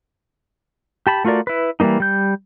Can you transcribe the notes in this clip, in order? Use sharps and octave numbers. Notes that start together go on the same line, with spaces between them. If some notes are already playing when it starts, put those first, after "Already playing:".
G4 A5 B5
A3 F4 F#4 A#4 D5
E4 B4
E3 G3 A3 A#3 D#4
G3 G6